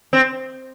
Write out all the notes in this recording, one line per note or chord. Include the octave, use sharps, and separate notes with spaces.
C4